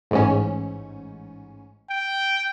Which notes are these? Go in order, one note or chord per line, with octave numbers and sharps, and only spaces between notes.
A1 G#2 C#4
G5